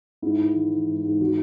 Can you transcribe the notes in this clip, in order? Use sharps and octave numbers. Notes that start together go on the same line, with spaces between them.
G#2 E4
G#2
E3
E3
G#2
G#2
E3 F#4